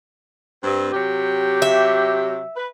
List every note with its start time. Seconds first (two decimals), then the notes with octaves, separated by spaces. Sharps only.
0.64 G2 C4
0.93 C3 F#3 G4
1.62 E5
2.57 B4